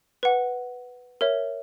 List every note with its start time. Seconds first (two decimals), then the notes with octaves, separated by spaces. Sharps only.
0.23 B4 F#5
1.21 A#4 C#5 E5